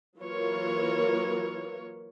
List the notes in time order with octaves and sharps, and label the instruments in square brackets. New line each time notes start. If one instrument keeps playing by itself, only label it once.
[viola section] E3 F#3 A#3 F4 A#4 C#5